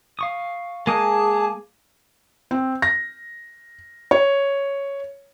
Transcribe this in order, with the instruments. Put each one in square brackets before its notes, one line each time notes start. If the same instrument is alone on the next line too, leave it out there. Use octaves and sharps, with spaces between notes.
[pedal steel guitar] F5 C#6 D#6
[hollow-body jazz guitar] G#3 A#3 [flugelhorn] G#4 [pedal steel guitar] G#5 D6 D#6 [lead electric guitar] A5
[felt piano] C4
A#6
C#5